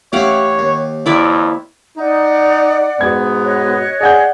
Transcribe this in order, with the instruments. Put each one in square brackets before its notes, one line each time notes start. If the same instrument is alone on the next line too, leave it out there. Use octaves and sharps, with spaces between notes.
[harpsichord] A1 E4 [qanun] G4 F5 F#5 [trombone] C#5
[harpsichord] D#2
[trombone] F2 [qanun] E4 D5 E5
[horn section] D#4 [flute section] D5 F#5
[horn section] G#2 B2 B3 [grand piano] G#6
[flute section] C#5 D#5 F#6
[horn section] G#4 [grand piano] D5 F#5 G6